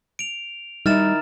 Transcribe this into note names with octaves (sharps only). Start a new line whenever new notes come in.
D7 F7
D#3 G3 D#4 E4 F6 A6 E7